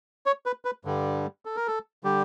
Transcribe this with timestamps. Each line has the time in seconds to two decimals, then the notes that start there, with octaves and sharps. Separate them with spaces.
0.26 C#5
0.46 B4
0.65 B4
0.85 G2 D3 G3
1.45 A4
1.56 A#4
1.68 A4
2.04 D3 G3 G4